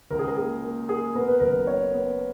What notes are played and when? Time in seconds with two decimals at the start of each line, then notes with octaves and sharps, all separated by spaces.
0.10 C#2 A#4
0.19 G#4
0.28 A#4
0.37 A#3 G#4
0.64 A#3
0.89 A#3 G#4
1.15 B3 A#4
1.28 B4
1.40 F#1 A#4
1.67 B3 C#5
1.94 B3